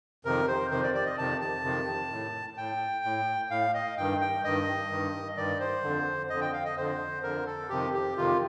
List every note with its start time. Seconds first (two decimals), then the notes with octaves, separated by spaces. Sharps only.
0.25 F2 C3 D#3 A#4
0.48 C5
0.71 F2 C3 D#3 C5
0.83 D5
0.94 D5
1.06 D#5
1.18 F2 C3 D#3 A5
1.41 A5
1.64 F2 C3 D#3
2.11 A2
2.57 A2 G5
3.05 A2
3.50 A2 F5
3.74 D#5
3.97 G2 D#3 G5
4.21 G5
4.44 G2 D#3 D#5
4.91 G2 D#3
5.37 G2 D#3 D5
5.60 C5
5.84 F2 D3
6.30 F2 D3 D#5
6.41 G5
6.53 F5
6.65 D#5
6.76 F2 D3 C5
7.23 F2 D3 A#4
7.46 A4
7.69 F2 C3 D#3 G4
7.93 G4
8.16 F2 C3 D#3 F4